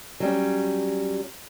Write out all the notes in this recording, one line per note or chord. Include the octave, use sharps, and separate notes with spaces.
F#3 G3 C#4